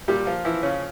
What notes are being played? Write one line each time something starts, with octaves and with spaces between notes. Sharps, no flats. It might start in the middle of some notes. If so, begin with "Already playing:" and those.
A#2 G3 G4
F3 F4
E3 F3 E4
C#3 C#4